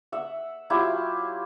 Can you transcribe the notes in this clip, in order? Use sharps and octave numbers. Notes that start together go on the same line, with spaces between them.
E5 F#5
F#3 E4 F4 G4